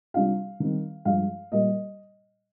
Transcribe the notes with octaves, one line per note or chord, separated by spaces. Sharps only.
C3 G3 D4 F4 F5
D#3 G3 C4
G2 F3 G#3 F5
A#2 G3 A#3 D#5